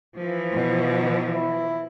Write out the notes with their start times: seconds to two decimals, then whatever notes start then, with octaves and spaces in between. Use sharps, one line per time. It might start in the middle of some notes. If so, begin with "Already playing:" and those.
0.18 E3 F3
0.53 B2
1.32 E4